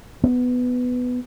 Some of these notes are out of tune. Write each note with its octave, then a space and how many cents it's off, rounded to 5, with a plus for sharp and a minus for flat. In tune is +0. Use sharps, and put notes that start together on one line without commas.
B3 +10